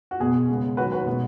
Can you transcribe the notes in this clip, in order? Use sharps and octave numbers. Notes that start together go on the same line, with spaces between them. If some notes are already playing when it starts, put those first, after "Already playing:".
F#4
B2 B3 G#4
C#3 G#3 B3
D#3 F#3 C#4 F#4 B4
F#4 B4
B2 G#3 B3